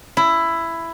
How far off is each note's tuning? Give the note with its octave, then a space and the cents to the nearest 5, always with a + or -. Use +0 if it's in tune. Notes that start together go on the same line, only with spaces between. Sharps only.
E4 +10